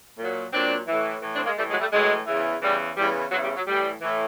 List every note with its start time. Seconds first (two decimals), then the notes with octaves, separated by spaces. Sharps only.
0.18 A#2
0.23 F#3
0.52 A#2 F#3 C4 D4
0.88 A2 E3
1.22 A2 E3
1.34 C4 D4
1.45 G#3 A#3
1.57 A2 E3 G3 A3
1.70 F#3 G#3
1.81 G3 A3
1.92 A2 E3 F#3 G#3
2.27 E2 C#3 E3
2.62 E2 C#3 E3 G3
2.97 E2 C#3 E3 G3
3.31 E2 C#3 E3 F#3
3.44 G3
3.56 F#3
3.67 A2 E3 G3
4.01 A2 E3